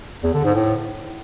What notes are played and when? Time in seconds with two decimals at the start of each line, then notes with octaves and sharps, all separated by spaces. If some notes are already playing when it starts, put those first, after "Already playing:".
0.23 E2
0.34 D3
0.45 G#2
0.55 A2